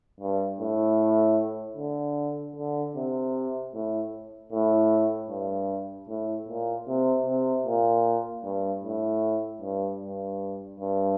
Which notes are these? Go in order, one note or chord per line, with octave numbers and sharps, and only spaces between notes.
G2
A2
D3
D3
C3
A2
A2
G2
A2
A#2
C3
C3
A#2
G2
A2
G2
G2
G2